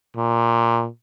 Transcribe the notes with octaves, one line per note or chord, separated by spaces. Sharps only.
A#2